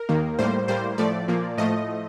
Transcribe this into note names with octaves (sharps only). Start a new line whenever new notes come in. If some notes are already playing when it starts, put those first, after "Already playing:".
Already playing: A#4
D#2 D#3 A#3
A2 G3 A#3 C5
A2 G3 A#3 C5
A2 F3 A3 D5
A#2 F3 A#3
A2 F3 A3 D#5